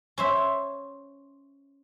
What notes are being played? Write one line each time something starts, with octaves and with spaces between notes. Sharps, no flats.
C#4 C5 E5